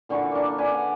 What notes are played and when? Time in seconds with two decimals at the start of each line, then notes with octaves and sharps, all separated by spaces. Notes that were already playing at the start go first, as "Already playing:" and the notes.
0.09 A#2 D3 E3 C#6
0.32 A#3 D4
0.58 D4 B4 G#5
0.74 F#5